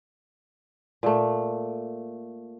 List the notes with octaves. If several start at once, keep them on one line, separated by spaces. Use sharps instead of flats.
A#2 A3